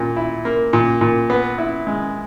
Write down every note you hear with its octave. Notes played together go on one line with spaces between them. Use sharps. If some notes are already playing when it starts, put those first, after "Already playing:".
Already playing: A#2
E4
A#3
A#2
A#2
B3
E4
G#3